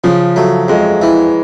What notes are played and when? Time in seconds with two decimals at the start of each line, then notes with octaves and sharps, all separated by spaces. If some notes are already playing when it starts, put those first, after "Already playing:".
0.04 C#3 F3
0.36 F#3 A3
0.68 F2 G#3
1.02 E3